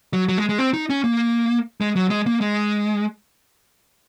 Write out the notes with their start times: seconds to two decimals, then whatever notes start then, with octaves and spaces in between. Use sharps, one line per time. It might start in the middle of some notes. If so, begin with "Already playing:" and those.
0.13 F#3
0.29 F#3
0.38 G#3
0.49 G#3
0.59 C4
0.73 D#4
0.90 C#4
1.04 A#3
1.81 G#3
1.96 F#3
2.10 G#3
2.27 A#3
2.41 G#3